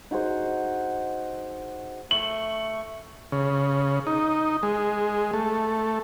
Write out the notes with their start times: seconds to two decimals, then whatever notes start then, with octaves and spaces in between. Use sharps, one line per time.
0.11 D#4 F#4 G#4 C5
2.11 A3 C#6 F#7
3.32 C#3
4.07 D#4
4.63 G#3
5.33 A3